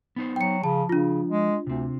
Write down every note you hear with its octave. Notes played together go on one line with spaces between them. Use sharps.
B3 D#4 C5
F#3 G5 C#7
C#3 F3 A5
C#3 D4 F4
G#3
D2 C3 C4